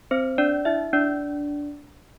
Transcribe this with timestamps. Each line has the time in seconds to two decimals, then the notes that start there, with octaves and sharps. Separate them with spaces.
0.11 C4 C5
0.38 D4 D5
0.65 E4 E5
0.93 D4 D5